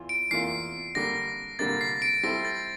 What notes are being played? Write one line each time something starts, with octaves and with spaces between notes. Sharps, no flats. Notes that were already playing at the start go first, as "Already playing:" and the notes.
Already playing: E2 E3 F4
D7
E2 E3 A#3 F4 C7
D3 G3 A#3 D4 A#6
D3 G3 A#3 D4 A6
C7
D7
G3 C4 E4 A4 C5 A#6
A6